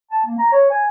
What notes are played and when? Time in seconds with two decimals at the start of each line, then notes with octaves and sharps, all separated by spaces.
0.11 A5
0.26 A#3
0.38 A#5
0.52 C#5
0.70 G#5